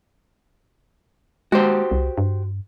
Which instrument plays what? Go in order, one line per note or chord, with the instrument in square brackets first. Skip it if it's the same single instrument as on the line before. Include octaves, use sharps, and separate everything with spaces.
[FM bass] G#3 [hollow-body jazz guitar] F#4 G4 C5
[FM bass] C2
G2